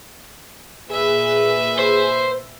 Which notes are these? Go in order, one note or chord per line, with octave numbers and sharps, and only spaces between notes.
A#2 G#4 B4 E5
C5